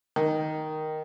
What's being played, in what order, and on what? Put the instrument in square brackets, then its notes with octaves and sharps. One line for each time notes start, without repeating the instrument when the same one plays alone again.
[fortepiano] D#3